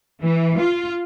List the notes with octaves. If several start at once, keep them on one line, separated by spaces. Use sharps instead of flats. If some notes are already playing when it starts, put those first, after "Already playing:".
E3
F4